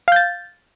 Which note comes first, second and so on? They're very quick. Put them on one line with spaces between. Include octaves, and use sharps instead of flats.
F5 G6 A6